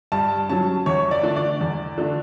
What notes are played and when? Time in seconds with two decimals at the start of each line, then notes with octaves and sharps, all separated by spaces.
0.12 G2 A5
0.49 F#3 C#4 A5
0.86 E2 C#5
1.11 D5
1.23 D3 A3 D4
1.36 D5
1.61 E2
1.98 D3 A3 D4